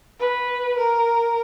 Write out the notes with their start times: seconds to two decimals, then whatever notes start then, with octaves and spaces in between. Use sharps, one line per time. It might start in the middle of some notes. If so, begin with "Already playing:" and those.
0.20 B4
0.78 A#4